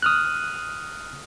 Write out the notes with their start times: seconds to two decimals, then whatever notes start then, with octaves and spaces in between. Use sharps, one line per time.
0.02 D#6 F6 F#6